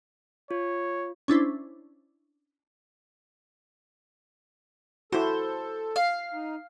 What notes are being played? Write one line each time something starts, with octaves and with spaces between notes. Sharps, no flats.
F4 C#5
C#4 D4 E4 C5
E4 F#4 A4 C5
F5
D#4